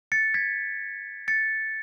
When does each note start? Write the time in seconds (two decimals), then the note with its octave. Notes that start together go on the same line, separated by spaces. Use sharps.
0.12 A6 C#7
0.34 G#6 B6
1.28 A6 C#7